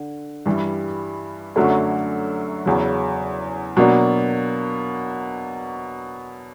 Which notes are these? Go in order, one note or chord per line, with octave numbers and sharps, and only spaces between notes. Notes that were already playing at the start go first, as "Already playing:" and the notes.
Already playing: D3
G2 E3 G3
F#2 D3 F#3 A3 C#4
E2 C#3 F#3
B2 F#3 A#3 D4